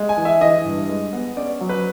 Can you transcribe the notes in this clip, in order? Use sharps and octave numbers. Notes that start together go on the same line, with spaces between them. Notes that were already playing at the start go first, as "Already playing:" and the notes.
Already playing: G#3
G#5
E3
E5
E3 D#5
G2
G#3
B3
C#4 D5
F#3
B4